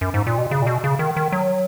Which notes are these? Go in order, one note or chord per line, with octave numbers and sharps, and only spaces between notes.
F#2
G#2
A#2
B2
C#3
A#2
B2
C#3
D#3
D#3
F#3